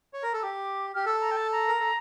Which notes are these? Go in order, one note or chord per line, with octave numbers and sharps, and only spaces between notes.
C#5
A#4
A4 E6
G4 D6
G4 F6
A4 E6
A#5
G5
A5
A#5
A#4
A4